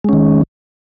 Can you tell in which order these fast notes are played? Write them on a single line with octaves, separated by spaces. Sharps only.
G#3 C#4 D#3